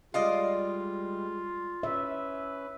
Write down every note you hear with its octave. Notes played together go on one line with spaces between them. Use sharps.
G3 G#3 F4 D5 D#5 F5
C#4 B4 E5